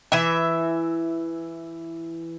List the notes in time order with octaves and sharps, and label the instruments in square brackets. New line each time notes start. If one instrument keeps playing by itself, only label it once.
[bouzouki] E3 E5